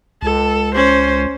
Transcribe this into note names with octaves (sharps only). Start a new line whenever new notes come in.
C#2 A4
C#4 C5